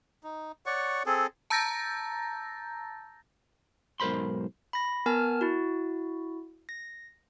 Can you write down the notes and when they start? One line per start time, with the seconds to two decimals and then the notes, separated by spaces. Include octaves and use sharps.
0.23 D#4
0.66 C#5 D5 F#5 C#6
1.06 C4 G#4 A4
1.50 A5 A#5 E6 G6 A6 A#6
4.00 B1 G#2 A#4 C5 B5 C6
4.73 B5 A#6
5.06 B3 A#4 G#5 A5 F6
5.41 E4 F#4
6.69 A#6